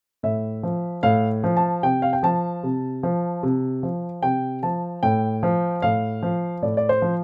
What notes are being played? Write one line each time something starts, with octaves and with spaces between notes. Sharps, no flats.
A2 E5
F3
A2 F5
F3
A5
C3 G5
F5
G5
F3 A5
C3
F3
C3
F3
C3 G5
F3 A5
A2 G5
F3
A2 F5
F3
A2 D5
D5
C5
F3